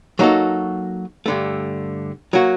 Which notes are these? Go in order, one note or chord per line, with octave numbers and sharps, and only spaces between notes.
F#3 A#3 D#4 F#4 A4
G2 D3 A3
F#3 A#3 F#4